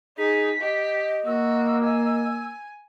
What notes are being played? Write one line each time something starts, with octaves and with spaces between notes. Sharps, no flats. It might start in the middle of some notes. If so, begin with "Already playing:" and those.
D#4 G#4 B6
G4 D#5
A#3 F#4 E6
G#5